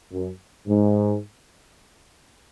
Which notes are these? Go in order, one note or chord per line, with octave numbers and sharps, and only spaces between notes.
F#2
G#2